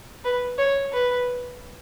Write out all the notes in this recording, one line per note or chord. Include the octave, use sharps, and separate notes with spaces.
B4
C#5
B4